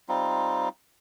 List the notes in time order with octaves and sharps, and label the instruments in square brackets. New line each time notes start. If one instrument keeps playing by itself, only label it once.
[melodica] G3 C4 D#4 F4